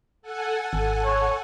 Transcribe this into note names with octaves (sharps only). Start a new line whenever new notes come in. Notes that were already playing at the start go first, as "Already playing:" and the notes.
A4 F#5 G#5
G#1
C#5